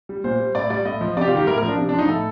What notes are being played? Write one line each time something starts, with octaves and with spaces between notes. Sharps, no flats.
G3
A#2 C5
G3
A2 D5
G3 D5
A2 D#5
F3
C3 G4 D5
F4
D#3 G3 G4
A2 A#4
A#4
F3
D4
C3
D4
F3
D#4
A2 A4